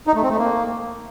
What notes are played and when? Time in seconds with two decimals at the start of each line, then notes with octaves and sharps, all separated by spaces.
0.07 D#4
0.15 A3
0.23 C4
0.31 A3
0.38 A#3